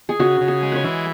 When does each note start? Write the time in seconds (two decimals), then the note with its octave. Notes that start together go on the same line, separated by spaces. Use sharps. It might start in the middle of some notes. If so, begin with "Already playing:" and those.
0.09 G#4
0.19 C#3 F#4
0.41 C#3
0.48 G#4
0.63 G#3
0.72 B4 C#5
0.84 E3